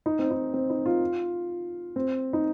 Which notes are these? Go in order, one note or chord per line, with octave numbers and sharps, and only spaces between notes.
D#4
C4
D#4
C4
D#4
F4
C4
D#4